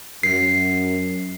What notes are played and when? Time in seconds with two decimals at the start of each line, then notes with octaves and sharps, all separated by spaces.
0.23 F#2 C7